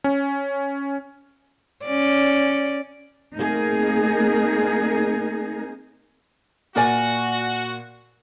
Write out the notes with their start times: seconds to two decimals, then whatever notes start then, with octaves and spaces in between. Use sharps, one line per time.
0.04 C#4
1.84 C#4 D5
3.36 A3 A#3 C4 D#4 G#4 A#4
6.76 A#2 F#4 A#4 D5 G#5